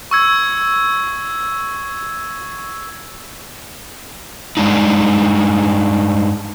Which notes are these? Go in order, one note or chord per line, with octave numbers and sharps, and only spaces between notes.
C#6 E6 G#6
G2 C#3 G#3 D4 D#4